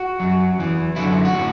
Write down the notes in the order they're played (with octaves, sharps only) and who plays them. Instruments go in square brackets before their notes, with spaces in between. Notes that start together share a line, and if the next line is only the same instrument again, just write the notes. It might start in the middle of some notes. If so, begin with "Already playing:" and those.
Already playing: [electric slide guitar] F#4
F#2 F#3
E2 E3
F#2 D3 F#3 E4
F#4
A2